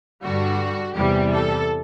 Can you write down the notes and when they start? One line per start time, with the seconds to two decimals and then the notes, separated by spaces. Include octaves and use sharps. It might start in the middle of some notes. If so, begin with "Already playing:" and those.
0.23 G2 D3 G3 F#4
0.95 E2 C3 E3 G3 G4
1.31 A4